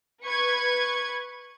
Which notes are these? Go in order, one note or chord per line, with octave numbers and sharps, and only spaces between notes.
B4 C#6 G#6